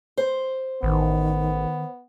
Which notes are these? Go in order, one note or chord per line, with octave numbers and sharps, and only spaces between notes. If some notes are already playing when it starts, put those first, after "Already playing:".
C5
A1 D#3 B3